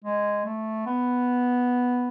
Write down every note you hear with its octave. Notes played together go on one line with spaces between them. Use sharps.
G#3
A3
B3